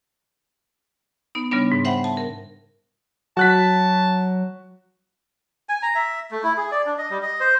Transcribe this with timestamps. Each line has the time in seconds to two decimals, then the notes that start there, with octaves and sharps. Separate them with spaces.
1.35 B3 D#4
1.51 C#3 G3 B3 D4
1.72 G#2
1.85 C5 E5 F#5 G5 B5 C6
2.04 A5
2.17 A#4
3.37 F#3 F#4 A5 F#6 B6
5.69 G#5
5.83 A#5
5.95 E5
6.31 A3
6.43 E4
6.57 G#4
6.71 D5
6.86 D4
6.98 D#5
7.10 G3
7.23 D#5
7.40 C5